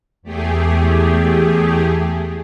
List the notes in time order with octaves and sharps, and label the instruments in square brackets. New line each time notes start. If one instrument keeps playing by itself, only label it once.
[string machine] E2 A3 G4 G#4